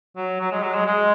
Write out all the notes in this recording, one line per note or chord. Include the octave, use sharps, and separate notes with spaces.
F#3
F#3
G#3
F#3
G#3
G#3